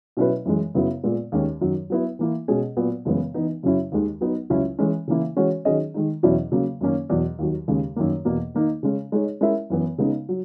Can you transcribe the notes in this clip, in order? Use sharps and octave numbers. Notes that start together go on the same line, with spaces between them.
B2 F#3 C#4 E4 B4
F#2 E3 G#3
F#2 C#3 F#3 B3 E4
A#2 G#3 B3
D#2 D#3 G#3 C#4
F#2 D#3 F#3
F#3 B3 E4
E3 A#3 E4
B2 G#3 C#4 G#4
A#2 F#3 B3
F#2 C#3 E3 G#3 B3
E3 B3 D#4
F#2 C#3 F#3 C#4 E4
D#2 D#3 G#3
F#3 B3 D#4
C#2 C#3 F#3 C#4 E4
E3 G#3 C#4
C#3 E3 A#3 E4
E3 G#3 C#4 F#4 C#5
D#3 F#3 C#4 G#4 D#5
D#3 G#3 D#4
E2 B2 F#3 C#4 E4
C#3 F#3 A#3
F#2 D#3 A#3 C#4
E2 B2 F#3
D#2 D#3 F#3
D#2 C#3 G#3
F#2 D#3 A#3
E2 B2 A#3
D#3 A#3 D#4
C#3 G#3 C#4
G#3 D#4 G#4 C#5
G#3 C#4 E4 A#4 E5
F#2 E3 B3
C#3 G#3 B3 D#4
F#3